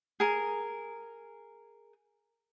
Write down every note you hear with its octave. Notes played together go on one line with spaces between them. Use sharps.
G#4 A#4